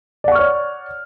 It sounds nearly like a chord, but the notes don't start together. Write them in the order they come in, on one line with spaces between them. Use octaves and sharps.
D5 F#5 C#6 F6 C#5